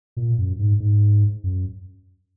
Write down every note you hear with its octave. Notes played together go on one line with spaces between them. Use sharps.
A#2
F#2
G#2
G#2
F#2